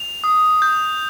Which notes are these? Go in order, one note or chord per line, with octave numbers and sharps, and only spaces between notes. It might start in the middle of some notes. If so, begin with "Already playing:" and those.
Already playing: F7
D#6
G6